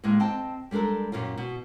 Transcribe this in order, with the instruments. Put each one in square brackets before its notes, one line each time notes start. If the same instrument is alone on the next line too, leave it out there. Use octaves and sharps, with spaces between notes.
[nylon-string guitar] A2 G3 G#3 A#3
C4 D#5 G5 A5
G3 G#3 D4 A4 A#4
F#2 A#2 D#3 A#3 C#4 F4
B2